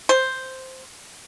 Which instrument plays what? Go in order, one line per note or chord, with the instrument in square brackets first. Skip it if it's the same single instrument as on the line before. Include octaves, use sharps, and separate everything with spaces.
[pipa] C5